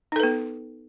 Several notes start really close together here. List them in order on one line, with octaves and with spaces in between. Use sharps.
D#4 A4 B4 B3